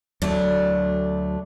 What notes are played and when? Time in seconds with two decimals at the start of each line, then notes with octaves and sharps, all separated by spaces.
0.22 D2 F#3 A3 D4